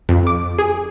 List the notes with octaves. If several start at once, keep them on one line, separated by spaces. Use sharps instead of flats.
F2
D6
G#4